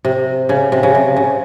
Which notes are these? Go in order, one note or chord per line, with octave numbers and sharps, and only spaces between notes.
C3
C#3
C3
C#3
C3
C#3